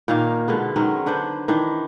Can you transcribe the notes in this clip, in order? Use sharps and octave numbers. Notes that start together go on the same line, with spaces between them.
A#2 D#3 A#3 F5
B2 D3 G#3 B3
D#3 F#3 G#3 C#4
D3 D4 B4 C5
D#3 E3 D4